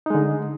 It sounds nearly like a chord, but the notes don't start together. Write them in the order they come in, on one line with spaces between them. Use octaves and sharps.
D#4 G#3 D3